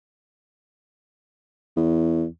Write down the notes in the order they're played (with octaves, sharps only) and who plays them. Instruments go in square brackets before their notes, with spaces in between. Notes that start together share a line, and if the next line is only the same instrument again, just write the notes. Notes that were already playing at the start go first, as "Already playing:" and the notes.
[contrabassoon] E2